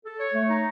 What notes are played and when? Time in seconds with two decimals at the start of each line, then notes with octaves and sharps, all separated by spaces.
0.05 A4
0.19 C#5
0.34 A3
0.49 D#4